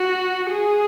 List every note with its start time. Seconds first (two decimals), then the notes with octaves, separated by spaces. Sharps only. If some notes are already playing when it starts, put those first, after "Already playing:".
Already playing: F#4
0.51 G#4